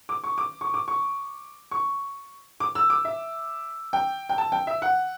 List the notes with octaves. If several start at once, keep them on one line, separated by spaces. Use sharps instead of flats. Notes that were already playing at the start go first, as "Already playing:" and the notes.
D6
C#6
D6
C#6
D6
C#6
C#6
D6
E6
D6
E5
G5
G5
A5
G5
E5
F#5